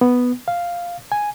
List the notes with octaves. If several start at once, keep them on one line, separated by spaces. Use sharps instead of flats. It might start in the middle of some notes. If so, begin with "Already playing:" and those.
B3
F5
G#5